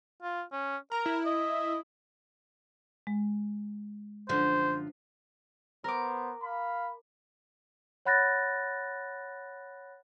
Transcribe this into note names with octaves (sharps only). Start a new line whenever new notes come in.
F4
C#4
A#4 A#5
E4
D#5
G#3
F#2 D3 F3 C5
B3 A#4 C5 D6
F5 B5
C#5 F#5 B5 F#6 A6 A#6